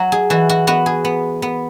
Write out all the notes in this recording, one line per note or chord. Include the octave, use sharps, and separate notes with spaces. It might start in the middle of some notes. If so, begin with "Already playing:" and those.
Already playing: F#3 F#4 F#5
G#4
E3 F#4
F#4
B3 F#4
G#4
B3
B3